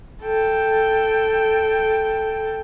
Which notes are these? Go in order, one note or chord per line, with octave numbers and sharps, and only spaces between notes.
A4 G5